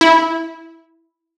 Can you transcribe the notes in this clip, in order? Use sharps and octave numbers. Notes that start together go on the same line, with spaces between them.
E4